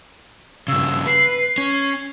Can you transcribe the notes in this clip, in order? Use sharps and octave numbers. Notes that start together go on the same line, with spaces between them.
G2 C#3 E6
B4 C7
C#4